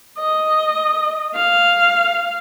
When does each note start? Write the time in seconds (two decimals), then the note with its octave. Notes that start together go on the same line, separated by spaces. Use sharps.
0.18 D#5
1.35 F5